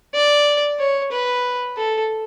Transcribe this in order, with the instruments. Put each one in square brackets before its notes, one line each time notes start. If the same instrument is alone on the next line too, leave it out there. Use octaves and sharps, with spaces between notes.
[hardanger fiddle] D5
C#5
B4
A4